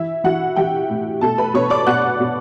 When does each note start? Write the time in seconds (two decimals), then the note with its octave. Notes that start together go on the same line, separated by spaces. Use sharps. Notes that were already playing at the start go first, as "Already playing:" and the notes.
Already playing: E3 E4 E5
0.24 E3 F#4 F#5
0.56 E3 G4 G5
0.90 A2
1.21 B2 A4 A5
1.38 B4 B5
1.54 B2 C#5 C#6
1.70 D5 D6
1.87 B2 F#5 F#6
2.20 B2